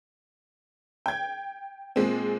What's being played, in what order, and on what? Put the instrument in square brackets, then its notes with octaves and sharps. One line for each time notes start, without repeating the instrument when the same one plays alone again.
[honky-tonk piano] G5 G#6
A#2 G#3 C4